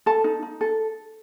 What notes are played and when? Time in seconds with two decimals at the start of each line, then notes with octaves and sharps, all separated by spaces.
0.06 A4 A5
0.24 D#4
0.43 D#4
0.61 A4